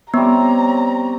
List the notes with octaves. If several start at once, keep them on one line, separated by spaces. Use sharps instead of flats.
G3 B3 C4 C#5 A#5